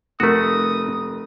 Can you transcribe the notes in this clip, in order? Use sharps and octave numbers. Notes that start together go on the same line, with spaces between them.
F1 A3 F#4 A#4 D#6